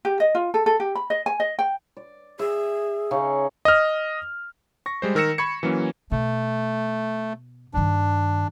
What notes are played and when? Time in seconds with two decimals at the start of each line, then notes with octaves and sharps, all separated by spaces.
0.05 G4
0.20 D#5
0.35 F4
0.54 A4
0.66 A4
0.80 G4
0.95 B5
1.10 D#5
1.26 G#5
1.40 D#5
1.59 G5
1.97 D5
2.39 G#4 E5
3.11 C#3 C#4 D#4
3.65 D#5 F6
4.86 C#6 A#6
5.02 G3 G#3 C5
5.15 D#3 A#4 E6 A#6 C#7 E7
5.38 B5 C#6 G#6 C#7
5.63 E3 F#3 A#3 C#4
6.12 B2 A3
7.74 G2 D#3 D4